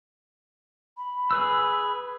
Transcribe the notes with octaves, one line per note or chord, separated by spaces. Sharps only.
B5
G#4 B4 E6